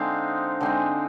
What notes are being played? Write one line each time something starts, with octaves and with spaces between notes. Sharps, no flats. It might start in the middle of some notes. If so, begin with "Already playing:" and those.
Already playing: D3 G#3 C4 D#4 F5
D3 G#3 C4 D#4